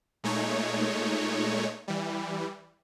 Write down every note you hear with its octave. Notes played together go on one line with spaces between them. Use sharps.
A#2 G#3 A3 D#4 C#5
E3 G3